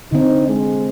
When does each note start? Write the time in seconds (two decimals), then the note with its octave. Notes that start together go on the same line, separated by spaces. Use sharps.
0.12 D3 C4 D#4
0.48 G#3